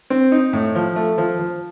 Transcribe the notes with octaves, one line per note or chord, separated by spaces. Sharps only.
C4
D#4
A2
F3
A3
F3
F3